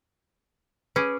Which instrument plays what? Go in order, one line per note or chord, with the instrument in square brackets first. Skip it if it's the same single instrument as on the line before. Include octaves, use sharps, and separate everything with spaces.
[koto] C#4 G#4 [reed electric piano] B4 C#6 D6